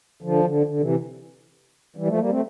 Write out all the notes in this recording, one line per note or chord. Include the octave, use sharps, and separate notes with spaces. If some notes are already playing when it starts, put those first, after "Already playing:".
D3 F3
D3
D3
C3 E3
E3 G3
F3 A3
G3 A#3
A3 C4